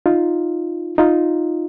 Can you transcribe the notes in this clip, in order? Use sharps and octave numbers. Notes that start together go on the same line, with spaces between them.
D#4 F4
D#4 F4